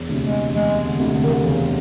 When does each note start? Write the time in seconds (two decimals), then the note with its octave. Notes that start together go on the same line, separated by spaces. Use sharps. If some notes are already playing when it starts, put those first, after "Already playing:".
Already playing: E1
0.09 D2 C3
0.24 G#3
0.53 E1 G#3
0.84 D3
0.99 D2 C3
1.14 D3
1.24 D#3
1.33 D3
1.43 E1 C#3